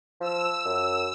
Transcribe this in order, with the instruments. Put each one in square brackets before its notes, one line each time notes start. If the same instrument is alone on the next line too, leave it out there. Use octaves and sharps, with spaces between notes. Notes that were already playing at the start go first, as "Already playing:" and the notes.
[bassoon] F3 [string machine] E6
[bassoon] F#2